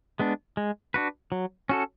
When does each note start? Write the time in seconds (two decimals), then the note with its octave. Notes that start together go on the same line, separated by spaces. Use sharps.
0.19 G#3 B3 D4
0.57 G#3
0.94 D4 F#4 B4
1.32 F#3
1.69 C#4 F#4 A4